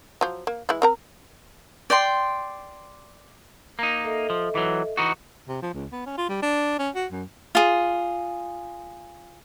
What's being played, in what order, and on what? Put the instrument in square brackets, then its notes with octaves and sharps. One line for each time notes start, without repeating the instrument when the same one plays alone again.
[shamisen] F3 F#3
A#3
E3 G#3 E4
C4 A#4 A#5
[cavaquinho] D5 G5 C6
[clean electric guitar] A#3 D#4 [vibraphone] A#5
[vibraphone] A4 D#5 E5
[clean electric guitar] F3
E3 F#3
E3 D#4 F#4
[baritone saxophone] C3
F3
C#2
B3
C#4
F4
G3
D4
C#4
F#4
F#2
[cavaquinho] F4 G#4